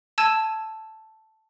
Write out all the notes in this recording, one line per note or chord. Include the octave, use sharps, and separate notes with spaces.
A5 E6 G#6 D#7 E7